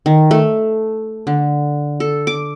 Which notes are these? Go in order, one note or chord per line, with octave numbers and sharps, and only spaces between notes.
D#3
A3
D3
A4
D6